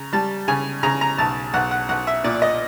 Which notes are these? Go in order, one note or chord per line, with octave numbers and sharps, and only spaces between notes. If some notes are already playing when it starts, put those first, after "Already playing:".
Already playing: C#3 A#5
G3 A5
C#3 G#5
C#3 A#5
A#5
B1 A5
B1 F#5
F#5
B1 F#5
E5
A#2 D5
D#5